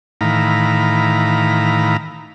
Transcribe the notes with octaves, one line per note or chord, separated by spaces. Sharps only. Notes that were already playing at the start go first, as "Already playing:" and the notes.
A2 D#3 E3 F5 A#5 B5